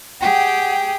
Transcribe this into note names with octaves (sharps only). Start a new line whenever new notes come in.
G4 G#4 F#5 G5